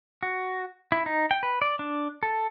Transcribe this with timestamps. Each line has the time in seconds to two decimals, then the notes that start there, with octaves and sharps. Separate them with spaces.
0.23 F#4
0.92 E4
1.06 D#4
1.31 G5
1.43 B4
1.62 D5
1.79 D4
2.23 A4